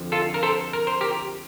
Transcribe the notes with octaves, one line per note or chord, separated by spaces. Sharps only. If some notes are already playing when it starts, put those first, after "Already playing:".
Already playing: F2 D3 F3
F4 A4
A#4
A4 C5
A#4
C5
G4 A#4